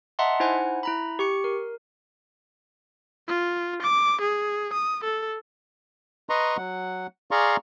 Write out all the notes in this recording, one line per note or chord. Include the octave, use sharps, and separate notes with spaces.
D#5 E5 F#5 A5 A#5 C6
D#4 E4 C5 F#5 G#5
E4 A#5 B5
G4 C#6 C#7
A#4
F4
D6
G#4
D#6
A4
B4 D#5 A#5 C6 C#6
F#3 F#5
G#4 D5 F5 A#5 C6 C#6